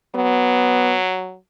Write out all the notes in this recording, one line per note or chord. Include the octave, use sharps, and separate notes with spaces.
F#3 B3